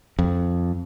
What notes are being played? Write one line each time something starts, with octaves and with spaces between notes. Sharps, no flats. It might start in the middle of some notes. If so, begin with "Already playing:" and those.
F2